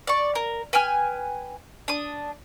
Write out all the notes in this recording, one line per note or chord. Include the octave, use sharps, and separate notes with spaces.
D5 C#6
A#4
B4 G5 G#5 F6
D4 D#6